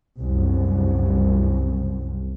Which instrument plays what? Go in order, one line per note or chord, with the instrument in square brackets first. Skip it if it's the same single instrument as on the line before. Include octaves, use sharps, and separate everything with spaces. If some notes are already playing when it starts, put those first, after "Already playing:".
[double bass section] C2 F#2